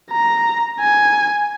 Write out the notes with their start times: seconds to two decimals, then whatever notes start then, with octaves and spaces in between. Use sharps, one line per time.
0.11 A#5
0.80 G#5